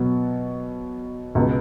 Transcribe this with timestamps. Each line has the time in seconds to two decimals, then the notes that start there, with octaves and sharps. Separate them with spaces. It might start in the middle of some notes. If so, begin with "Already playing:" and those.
Already playing: B2 F#3 B3 F#4
1.35 C#2 B2 B3